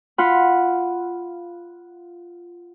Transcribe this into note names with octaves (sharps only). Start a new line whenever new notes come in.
F4 F#5 B5